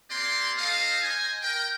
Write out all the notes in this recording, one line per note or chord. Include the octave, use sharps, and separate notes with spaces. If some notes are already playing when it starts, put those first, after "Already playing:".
A#3 C4 G4 D5 C6
D#4 A4 D#5 F5
C5 D#5 G#5
A#4 G5